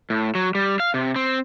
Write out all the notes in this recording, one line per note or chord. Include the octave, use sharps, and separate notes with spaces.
A2
F#3
G3
F5
C3
C4